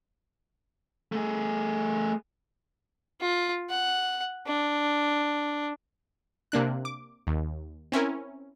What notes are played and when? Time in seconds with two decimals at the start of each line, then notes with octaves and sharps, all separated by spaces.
1.12 A3 G#4
3.21 F4
3.70 F#5
4.47 D4
6.52 C3 A#3 D4 F#6
6.85 D6
7.27 D#2
7.92 C4 C#4 E4 A#4